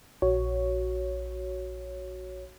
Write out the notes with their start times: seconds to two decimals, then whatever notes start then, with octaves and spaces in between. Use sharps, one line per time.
0.22 A#1 F#4 C#5